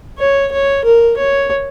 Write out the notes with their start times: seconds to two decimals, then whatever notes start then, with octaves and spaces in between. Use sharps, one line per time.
0.18 C#5
0.52 C#5
0.84 A#4
1.17 C#5